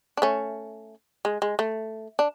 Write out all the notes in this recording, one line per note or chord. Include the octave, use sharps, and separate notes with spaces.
D4
A3 C#4
G#3
G#3
A3
D4